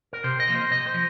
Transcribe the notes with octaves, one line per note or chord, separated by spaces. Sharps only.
A#4
C3 C5
D#5
F3 A#3
C5
C3 D#5
C5
F3